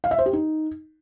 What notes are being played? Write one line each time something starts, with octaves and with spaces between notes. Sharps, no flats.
F5
E5
C5
G4
D#4